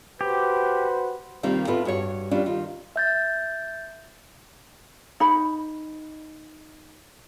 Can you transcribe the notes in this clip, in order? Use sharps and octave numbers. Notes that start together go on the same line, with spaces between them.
F#4 G4 B4 C5
C3 D#3 G3 A#3 C4 F4
A2 A3 B3 F4 B4
G2 F#4 C#5
G3 C#4 D4 F4
D#3 F4
E5 G6 A6
D#4 B5